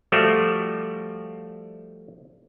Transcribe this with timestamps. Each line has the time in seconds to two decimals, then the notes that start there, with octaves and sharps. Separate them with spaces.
0.12 F3 G3 A3 F#4